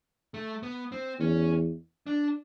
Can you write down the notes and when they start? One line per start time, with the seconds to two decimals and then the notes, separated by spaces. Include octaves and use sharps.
0.34 A3
0.63 B3
0.92 C4
1.20 E2 C#4
2.07 D4